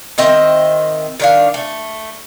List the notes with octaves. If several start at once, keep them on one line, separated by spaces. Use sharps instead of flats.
D#3 C4 D#5 E5
D#3 D4 F5
A3